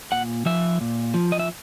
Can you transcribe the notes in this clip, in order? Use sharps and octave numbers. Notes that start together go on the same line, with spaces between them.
A#2 F#5
F3 E5
A#2
F3
D#5
E5